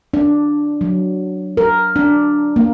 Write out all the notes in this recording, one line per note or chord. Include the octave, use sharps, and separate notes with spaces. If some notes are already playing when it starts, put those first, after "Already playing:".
D4
F#3
A#4
D4
A#3